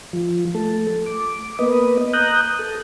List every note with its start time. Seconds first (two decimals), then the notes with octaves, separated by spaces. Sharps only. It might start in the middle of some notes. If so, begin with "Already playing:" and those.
0.13 F3
0.55 A3 A4
1.06 D6
1.59 A#3 B3 B4 D#5
2.13 A#5 D#6 F#6 G6
2.59 A4